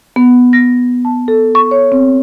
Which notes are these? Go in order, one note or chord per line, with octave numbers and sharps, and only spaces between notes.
B3
A#6
A5
A4
C#6
C#5
C4